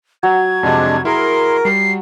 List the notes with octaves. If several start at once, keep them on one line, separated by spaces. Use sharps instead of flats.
F#3 G#6
F2 C3 G#3 D4
E4 G#4 A#4 C6
G3 C7